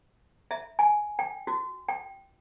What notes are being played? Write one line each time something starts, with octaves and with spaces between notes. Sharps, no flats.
E5
G#5
G5
F#4
G5